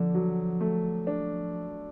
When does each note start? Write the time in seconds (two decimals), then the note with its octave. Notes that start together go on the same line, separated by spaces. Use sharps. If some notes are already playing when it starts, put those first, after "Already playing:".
Already playing: D3 F3 D4
0.15 F#3
0.60 A3
1.07 D4